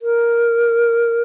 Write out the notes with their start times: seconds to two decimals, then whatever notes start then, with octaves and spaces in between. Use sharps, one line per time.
0.02 A#4